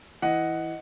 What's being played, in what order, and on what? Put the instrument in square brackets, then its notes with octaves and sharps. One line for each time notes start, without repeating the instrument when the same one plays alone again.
[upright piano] E3 [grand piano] D#5 F#5